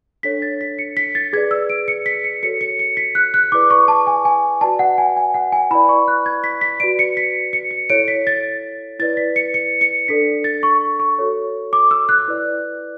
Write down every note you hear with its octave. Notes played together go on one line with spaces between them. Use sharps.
D4 A4 C#5 B6
A6
B6
C#7
B6
A6
G#4 B4 D5 G#6
E6
D7
C#7
B6
C#7
F#4 A4 C#5 C#7
C#7
C#7
B6
F#6
F#6
E4 G#4 B4 D5 D6
C#6
A5
G#5
G#5
F#4 B4 D5 A5
F#5
G#5
G#5
F#5
G#5
E4 B4 D5 B5
C#6
F#6
G#6
B6
B6
F#4 B4 D5 D7
C#7
B6
C#7
C#7
E4 A4 C#5 D7
B6
A6
E4 B4 D5 A6
B6
C#7
C#7
C#7
D4 A4 D5 B6
A6
C#6
C#6
F#4 A4 C#5
D6
E6
F#6
E4 B4 D5